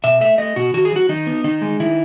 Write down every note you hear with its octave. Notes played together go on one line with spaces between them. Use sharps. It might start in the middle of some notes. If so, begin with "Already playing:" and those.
B2 E5
A3 E5
A3 D#5
B2 F#4
D#3 F#4
G#4
F#3 F#4
D#3 D#4
B3
D#3 D#4
G#3
D#3 E4